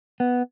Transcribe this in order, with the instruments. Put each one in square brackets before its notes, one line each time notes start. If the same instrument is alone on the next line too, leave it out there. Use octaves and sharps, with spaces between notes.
[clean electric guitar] B3